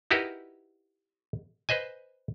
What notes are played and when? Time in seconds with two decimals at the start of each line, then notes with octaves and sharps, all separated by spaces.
0.11 D#4 E4 F#4 G4 A#4 B4
1.69 B4 C5 D#5 G#5